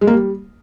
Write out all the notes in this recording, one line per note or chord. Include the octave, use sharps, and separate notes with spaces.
G#3
A#3
G3